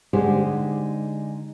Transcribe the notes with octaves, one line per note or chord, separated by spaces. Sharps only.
D3 G#3 D#4 G4 G#4 C5